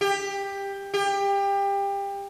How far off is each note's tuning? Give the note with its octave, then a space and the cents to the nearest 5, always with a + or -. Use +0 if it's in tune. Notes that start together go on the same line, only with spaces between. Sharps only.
G4 +15
G4 +25